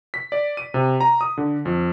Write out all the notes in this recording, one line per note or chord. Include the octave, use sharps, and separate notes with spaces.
B6
D5
D#7
C3
A#5
D#6
D3
F2